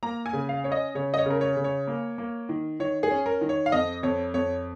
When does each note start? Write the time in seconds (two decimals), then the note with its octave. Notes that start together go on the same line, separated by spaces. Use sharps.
0.03 A#3 A#5
0.26 G#5
0.33 C#3
0.49 F5
0.64 C#4 C#5
0.72 D#5
0.95 C#3 C#5
1.14 D#5
1.18 C#5
1.26 C#3 A#4
1.41 C#5
1.57 C#3
1.64 C#5
1.87 A#3
2.18 A#3
2.49 D#3
2.80 D#3 C#5
3.03 G#4
3.11 C#4
3.26 A#4
3.41 D#3
3.49 C#5
3.66 F5
3.72 F2 D#5
4.03 F2 C#5
4.34 F2 C#5